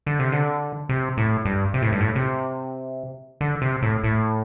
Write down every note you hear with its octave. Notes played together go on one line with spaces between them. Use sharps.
D3
C3
D3
C3
A2
G2
C3
A2
G2
A2
C3
D3
C3
A2
A2